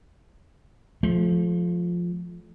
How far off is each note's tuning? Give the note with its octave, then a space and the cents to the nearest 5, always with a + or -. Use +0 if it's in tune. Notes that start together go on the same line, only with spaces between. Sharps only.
F3 +0 A3 -35